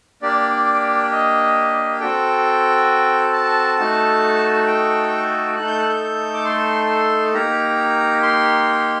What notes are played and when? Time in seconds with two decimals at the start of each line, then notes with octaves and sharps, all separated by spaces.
0.22 A#3 D4 G4 D5
1.12 D#5
2.00 C4 F#4 A4 G5
3.33 A5
3.78 A3 D#4 F#4 A4
4.67 G5
5.56 A3 D#4 A4 F#6
5.67 G6
5.78 F#6
5.89 G6
6.34 D6
6.45 C6
7.33 A#3 D#4 G4 A#5
8.22 C6